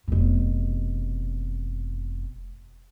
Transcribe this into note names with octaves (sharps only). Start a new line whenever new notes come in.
F1 B2